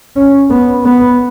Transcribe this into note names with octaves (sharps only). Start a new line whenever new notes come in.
C#4
B3
B3